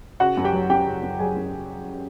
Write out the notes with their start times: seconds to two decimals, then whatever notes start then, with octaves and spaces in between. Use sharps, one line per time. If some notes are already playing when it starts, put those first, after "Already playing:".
0.20 C#3 F#4 F#5
0.37 F#2
0.44 G4 G5
0.53 F#3
0.70 F#2 G4 G5
0.87 C#3
1.03 F#2
1.19 F#3 G#4 G#5
1.36 F#2
1.53 C#3